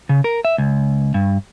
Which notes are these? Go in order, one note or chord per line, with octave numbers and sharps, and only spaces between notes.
C#3
A#4
E5
C#2
G2